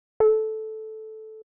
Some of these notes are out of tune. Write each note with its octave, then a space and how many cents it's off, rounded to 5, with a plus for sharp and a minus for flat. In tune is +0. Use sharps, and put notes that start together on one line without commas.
A4 -10